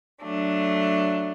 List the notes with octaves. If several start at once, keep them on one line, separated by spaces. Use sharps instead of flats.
F#3 A3 D4